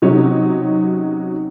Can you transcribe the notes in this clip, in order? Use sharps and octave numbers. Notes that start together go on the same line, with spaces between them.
C3 F#3 C#4 D#4